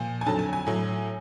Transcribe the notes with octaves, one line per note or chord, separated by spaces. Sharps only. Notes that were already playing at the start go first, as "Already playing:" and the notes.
Already playing: A#2 F3
G#5
F2 D3 F#3 A5
G#5
G#5
A2 F#3